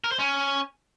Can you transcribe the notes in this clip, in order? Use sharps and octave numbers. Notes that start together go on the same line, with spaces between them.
A#4
C5
C#4